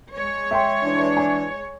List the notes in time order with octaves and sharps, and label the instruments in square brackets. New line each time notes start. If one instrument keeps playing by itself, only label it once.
[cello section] G#3 C#5
[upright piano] E5 G5 C6
[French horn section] E3 D4
[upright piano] G#5